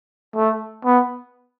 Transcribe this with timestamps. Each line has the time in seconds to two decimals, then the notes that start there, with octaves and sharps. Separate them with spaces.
0.36 A3
0.85 B3